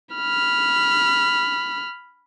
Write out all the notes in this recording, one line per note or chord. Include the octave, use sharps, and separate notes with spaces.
B5 F6